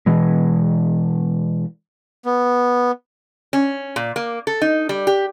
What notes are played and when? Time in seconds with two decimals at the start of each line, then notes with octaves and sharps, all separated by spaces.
0.06 B2 E3 G#3
2.26 B3
3.53 C#4
3.96 A#2
4.16 A#3
4.47 A4
4.62 D#4
4.89 G3
5.07 G4